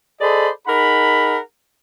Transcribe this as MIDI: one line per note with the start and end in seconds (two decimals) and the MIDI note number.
0.21 0.50 68
0.21 0.50 69
0.21 0.50 72
0.21 0.50 74
0.21 0.50 75
0.21 0.50 83
0.67 1.39 63
0.67 1.39 68
0.67 1.39 70
0.67 1.39 78
0.67 1.39 83